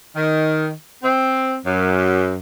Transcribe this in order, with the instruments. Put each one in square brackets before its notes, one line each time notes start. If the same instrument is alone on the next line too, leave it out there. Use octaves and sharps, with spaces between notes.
[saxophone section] D#3
C4
F#2